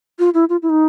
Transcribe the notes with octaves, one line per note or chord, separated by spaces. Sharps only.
F4
E4
F4
E4
D#4